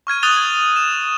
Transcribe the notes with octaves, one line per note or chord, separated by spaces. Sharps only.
C#6 F6 G#6 D#7
D#6 F#6 A6 D#7 F7 G7
G#6
E7